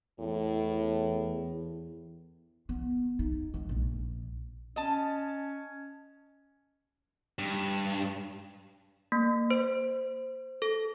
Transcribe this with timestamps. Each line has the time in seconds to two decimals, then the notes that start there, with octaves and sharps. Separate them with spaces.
0.20 E2 A2
2.69 B3
3.19 D#4
3.54 G#3
3.69 A#1
4.76 C#4 D#5 A5
7.39 G2
9.12 A#3
9.50 C5
10.62 A4